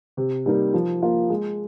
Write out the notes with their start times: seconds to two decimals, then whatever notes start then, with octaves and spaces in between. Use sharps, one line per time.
0.17 C3
0.46 G3 A#3 D#4 A#4
0.74 F3
1.02 A#3 F4
1.30 G#3